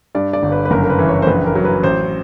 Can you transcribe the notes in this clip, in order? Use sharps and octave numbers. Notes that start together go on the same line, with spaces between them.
G2 D5
D5
G1
B4
B4
F#1 A#4
A#4
B4
E3
C#5
C5
A#1 B4
A#4
F#3
B4
A1 C5